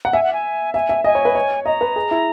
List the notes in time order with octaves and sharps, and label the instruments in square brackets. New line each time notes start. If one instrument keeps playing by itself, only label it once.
[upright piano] F#5
[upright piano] E5 [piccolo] G#5
[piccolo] F#5
G#5
[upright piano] E5 [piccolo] G#5
[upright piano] E5
[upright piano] D#5 [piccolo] G#5
[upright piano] C#5
B4
C#5
[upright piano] D#5 [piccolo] A#5
[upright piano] B4
G#4
E4